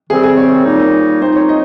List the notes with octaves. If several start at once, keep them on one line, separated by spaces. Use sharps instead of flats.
C3 D#3 G3 C4 G#4
G#4
C#5
A#2 G3 A#3 D#4
F3 C4 D#4 C5
C#5
D#5